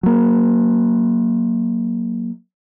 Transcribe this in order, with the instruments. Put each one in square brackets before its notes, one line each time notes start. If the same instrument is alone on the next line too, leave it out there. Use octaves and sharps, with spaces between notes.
[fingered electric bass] F#3 A#3